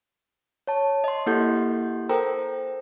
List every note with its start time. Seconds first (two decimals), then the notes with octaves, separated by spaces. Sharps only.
0.67 C#5 A5
1.04 D#5 C6
1.26 A#3 E4 G4 A4 F#5 G6
2.09 A4 A#4 C5 G5 A#5